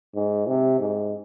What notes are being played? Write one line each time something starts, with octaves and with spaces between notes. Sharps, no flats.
G#2
C3
G#2